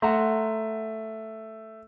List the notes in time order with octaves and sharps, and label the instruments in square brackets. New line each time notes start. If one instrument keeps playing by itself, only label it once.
[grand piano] A3 [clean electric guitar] F#5 A#5 C6